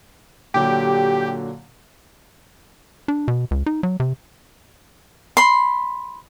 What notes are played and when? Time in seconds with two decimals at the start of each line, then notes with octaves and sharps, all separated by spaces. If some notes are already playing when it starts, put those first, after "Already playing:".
0.54 A#2 D3 F#3 G4
3.08 D4
3.28 B2
3.51 C#2
3.66 D#4
3.83 F#3
4.00 C3
5.37 B5 C6